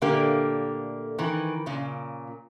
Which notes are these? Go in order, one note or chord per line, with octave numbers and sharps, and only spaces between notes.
A#2 D3 A3 A#3 G4
D#3 E3
A#2 C#3